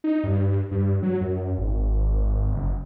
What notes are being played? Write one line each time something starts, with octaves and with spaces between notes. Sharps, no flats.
D#4
G2
G2
F#3
F#2
G#1
F#1